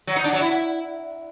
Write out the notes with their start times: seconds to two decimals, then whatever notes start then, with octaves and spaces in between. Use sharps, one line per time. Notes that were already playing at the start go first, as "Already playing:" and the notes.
0.07 F#3
0.16 D#4
0.24 D4
0.33 F#3
0.41 E4